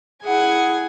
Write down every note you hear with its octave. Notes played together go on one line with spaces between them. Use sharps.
E4 G#4 F#5 G#5